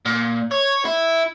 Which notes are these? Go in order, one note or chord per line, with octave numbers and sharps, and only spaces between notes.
A#2
C#5
E4